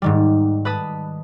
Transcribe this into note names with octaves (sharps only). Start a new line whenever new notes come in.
G#2 D#3 G3
B4 A5 B5 D#6 A6